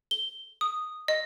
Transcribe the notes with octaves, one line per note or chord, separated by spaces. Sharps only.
G7
D#6
D#5